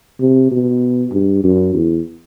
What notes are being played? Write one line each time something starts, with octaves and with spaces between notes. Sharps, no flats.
C3
B2
G2
F#2
E2